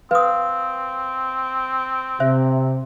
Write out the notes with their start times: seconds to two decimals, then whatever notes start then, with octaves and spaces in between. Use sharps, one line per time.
0.11 C4 B4 F5 D#6
2.20 C3 C5 E5